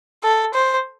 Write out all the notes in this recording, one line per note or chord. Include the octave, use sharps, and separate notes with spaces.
A4
C5